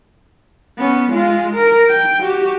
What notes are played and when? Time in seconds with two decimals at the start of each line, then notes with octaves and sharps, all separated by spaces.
0.78 B3 C#4
1.12 G#3 F4
1.54 A#4
1.89 G5
2.21 F#4 G4